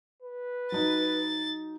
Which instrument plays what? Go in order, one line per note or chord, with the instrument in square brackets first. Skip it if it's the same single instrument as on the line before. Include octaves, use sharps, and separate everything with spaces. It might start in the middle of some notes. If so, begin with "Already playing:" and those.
[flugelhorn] B4
[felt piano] F#3 D#4 [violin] A6